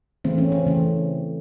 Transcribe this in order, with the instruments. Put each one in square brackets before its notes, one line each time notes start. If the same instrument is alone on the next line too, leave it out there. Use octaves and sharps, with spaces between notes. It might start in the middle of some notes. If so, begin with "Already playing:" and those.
[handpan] C#3 E3 A3 C4
C#4
C4
C#3 E3 A3